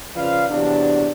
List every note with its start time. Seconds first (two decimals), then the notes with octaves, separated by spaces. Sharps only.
0.16 C#3 F3 B4 D5 F5
0.49 E2 C3 F#3 D4